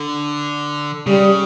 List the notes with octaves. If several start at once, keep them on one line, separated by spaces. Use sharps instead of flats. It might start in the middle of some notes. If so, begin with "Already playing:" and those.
Already playing: D3
C#3 G3